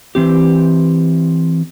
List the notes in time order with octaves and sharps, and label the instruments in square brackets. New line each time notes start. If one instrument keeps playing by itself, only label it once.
[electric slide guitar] E3 C4 G4